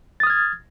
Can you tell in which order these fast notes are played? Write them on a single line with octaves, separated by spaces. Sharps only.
A6 D#6 F6 G#6